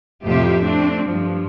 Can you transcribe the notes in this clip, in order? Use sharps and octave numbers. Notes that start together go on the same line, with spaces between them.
F2 A2 C3 F4 G4 E5
A3 C4 D4
G2 F3